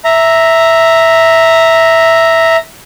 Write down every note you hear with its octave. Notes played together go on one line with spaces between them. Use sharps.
E5 A#5